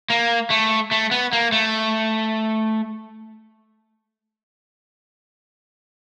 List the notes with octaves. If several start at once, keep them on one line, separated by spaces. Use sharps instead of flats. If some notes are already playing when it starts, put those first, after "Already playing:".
A#3
A3
A3
B3
A#3
A3